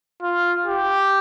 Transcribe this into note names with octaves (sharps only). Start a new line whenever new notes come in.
F4
G4